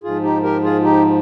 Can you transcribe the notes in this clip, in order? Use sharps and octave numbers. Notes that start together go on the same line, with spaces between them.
G#2 F3 F4 G#4
D#4 G4
G4 A#4
F4 G#4
D#4 G4